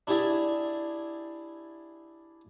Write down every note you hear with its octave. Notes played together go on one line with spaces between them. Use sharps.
D4 E4 G4 G#4 D5 E5